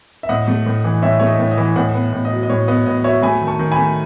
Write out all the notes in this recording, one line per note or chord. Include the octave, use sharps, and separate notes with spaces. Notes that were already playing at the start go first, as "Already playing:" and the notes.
E5
A2 D#5 F#5
A3
A2
E3
A2 C#5 E5
A3 C#5
D#5
A2
D#5
E3
A2 D#5 F#5
B3
A2
D#5
F#3
D#5
A2 C#5
B3 D#5
A2 D#5
F#3 C#5 E5
A3 G#5 B5
D#3
A5 C#6
D#3
G#5 B5
A3